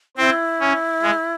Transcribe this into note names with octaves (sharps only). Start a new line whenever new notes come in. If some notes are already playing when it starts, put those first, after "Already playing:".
C4 E4
C#4
G#3